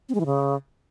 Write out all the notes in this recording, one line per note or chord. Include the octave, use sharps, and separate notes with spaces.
C4
G#3
E3
C#3